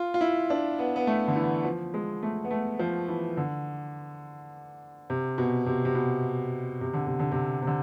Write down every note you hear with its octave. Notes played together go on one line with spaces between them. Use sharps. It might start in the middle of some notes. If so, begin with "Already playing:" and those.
Already playing: F4
F4
E4
D4
B3
B3
A3
D3
E3
F3
G#3
A3
B3
A3
F3
E3
D3
C3
B2
C3
C3
B2
C3
D3
C3
D3
C3
C3
D3